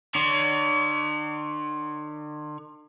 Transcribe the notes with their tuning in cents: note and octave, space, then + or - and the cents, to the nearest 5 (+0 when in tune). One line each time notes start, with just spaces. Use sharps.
D3 +45 C#5 +40